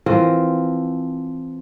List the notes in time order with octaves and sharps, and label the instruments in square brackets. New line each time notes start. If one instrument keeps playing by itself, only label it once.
[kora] E3 F3 C4 A#4